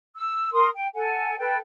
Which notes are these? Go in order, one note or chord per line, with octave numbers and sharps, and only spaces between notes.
E6
A#4 C6 D#6
G5
A4 F#5 G#5
A4 B4 G5